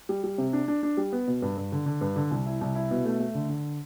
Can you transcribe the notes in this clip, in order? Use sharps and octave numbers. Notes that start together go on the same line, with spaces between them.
G3
G3
C3
D4
D4
D4
G3
B3
B2
G2
G2
D3
D3
G2
D3
C2
E4
C2
E4
B2
A3
A3
D3
D3